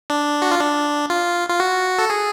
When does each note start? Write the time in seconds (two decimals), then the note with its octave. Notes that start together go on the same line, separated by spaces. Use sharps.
0.10 D4
0.42 F#4
0.51 F4
0.60 D4
1.10 F4
1.49 F4
1.60 F#4
1.99 A4
2.10 G#4